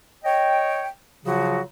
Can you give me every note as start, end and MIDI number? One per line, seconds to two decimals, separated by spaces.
0.25 0.86 73
0.25 0.86 75
0.25 0.86 79
1.24 1.60 49
1.24 1.60 53
1.24 1.60 54
1.24 1.60 65
1.24 1.60 66